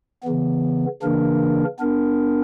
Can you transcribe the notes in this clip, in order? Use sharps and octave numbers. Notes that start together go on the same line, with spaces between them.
C#3 E3 B3
C#3 E3 A#3 D4 A#4
B3 D4 A#4